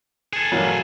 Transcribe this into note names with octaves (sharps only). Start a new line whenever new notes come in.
G#4 A4
A1 A#2 F#3